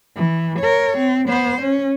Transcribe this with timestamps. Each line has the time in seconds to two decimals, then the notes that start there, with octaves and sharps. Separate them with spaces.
0.16 E3
0.59 A#4 C#5
0.97 C4
1.28 B3 C5
1.62 C#4